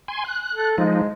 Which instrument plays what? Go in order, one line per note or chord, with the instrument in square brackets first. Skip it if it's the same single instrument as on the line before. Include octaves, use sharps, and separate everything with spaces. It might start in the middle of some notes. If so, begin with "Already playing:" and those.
[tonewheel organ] G#5 C6
F#6
[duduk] A4
[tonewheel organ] F3 D#4 [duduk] G#3